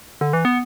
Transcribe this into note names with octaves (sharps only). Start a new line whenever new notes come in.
D3
E3
B3